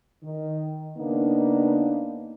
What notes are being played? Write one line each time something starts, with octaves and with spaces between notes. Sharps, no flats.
D#3
C#3 A#3 B3 D4 D#4